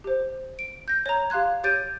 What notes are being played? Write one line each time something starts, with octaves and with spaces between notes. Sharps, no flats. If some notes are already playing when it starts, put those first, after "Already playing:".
G4 C5
D7
G6 A#6
C#5 A#5
G4 F5 C6 F#6 G#6
G4 C#5 G6 A6 D7 D#7